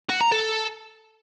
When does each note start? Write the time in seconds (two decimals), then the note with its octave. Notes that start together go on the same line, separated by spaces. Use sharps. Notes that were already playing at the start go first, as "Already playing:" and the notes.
0.09 F#4
0.21 A#5
0.32 A4